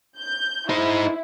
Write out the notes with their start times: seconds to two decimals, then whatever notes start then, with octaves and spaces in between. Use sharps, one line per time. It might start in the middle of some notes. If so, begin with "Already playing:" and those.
0.18 G6
0.69 D#4 E4 C5